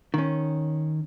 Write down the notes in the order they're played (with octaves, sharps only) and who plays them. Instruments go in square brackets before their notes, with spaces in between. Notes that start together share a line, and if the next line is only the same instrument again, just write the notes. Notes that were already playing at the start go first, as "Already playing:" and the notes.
[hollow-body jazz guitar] D#3 C#4